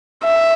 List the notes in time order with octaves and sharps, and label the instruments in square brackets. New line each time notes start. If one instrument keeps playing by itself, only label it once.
[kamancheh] E5